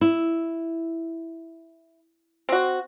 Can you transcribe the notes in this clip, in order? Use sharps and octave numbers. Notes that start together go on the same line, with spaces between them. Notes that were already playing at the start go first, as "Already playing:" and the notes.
E4
C4 F#4